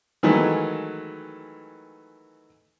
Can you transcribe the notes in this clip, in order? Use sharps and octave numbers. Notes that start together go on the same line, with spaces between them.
D#3 E3 F#3 G#3 A3